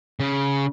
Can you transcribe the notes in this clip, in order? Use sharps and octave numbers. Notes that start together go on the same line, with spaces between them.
C#3